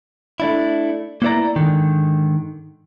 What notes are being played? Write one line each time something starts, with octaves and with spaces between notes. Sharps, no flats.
A3 D4 E4
A#3 B3 E4 C5 D5 A#5
G#2 D3 D#3